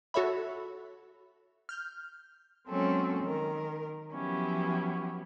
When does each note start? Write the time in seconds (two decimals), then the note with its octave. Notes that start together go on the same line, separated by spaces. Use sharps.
0.14 F#4 A4 C#5 E5 B5
1.69 F6 G6
2.68 F#3 G#3 A#3 C4 C#4 A4
3.23 D#3 A#4
4.12 F3 F#3 B3 C#4 E4 G4